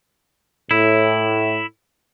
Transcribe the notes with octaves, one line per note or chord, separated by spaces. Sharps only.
A2 E4